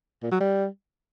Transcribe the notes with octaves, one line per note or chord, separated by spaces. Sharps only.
A#2
F#3
G3